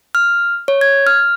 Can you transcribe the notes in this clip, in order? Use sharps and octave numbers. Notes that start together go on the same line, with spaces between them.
F6
C#5
G#6
F6